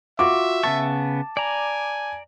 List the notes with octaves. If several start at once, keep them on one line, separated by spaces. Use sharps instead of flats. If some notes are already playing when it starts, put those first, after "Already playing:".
F4 F#4 E5 D6
C#3 B3 A5 C#6
D5 G#5 A#5